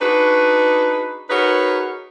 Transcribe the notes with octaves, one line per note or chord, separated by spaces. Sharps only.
D4 D#4 F#4 G#4 B4
D#4 F#4 G#4 A#4 B4 C#5